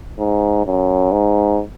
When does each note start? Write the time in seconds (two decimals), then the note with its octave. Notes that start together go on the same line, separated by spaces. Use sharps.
0.19 G#2
0.66 F#2
1.12 G#2